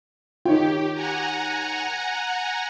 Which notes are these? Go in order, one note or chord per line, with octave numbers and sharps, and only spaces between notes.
D#3 D#4 F4 G4 C#5 G5
F#5 G#5 A#5